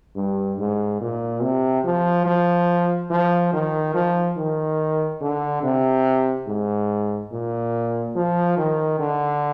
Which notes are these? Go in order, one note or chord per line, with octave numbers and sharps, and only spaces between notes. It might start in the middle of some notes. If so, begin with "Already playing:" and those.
G2
G#2
A#2
C3
F3
F3
F3
D#3
F3
D#3
D3
C3
G#2
A#2
F3
D#3
D3